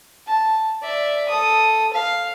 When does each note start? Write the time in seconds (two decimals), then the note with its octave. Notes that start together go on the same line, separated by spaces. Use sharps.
0.27 A5
0.83 D5 E5
1.29 A4 D#6
1.93 F5